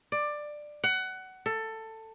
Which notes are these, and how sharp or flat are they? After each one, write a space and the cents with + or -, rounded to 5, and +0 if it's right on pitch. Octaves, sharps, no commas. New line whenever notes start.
D5 +15
F#5 +20
A4 +15